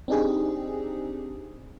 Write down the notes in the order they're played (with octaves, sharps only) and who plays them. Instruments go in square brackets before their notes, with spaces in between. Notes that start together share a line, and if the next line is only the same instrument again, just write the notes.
[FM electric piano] C4 D4 D#4 G4 G#4